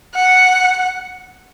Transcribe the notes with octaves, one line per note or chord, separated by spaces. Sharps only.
F#5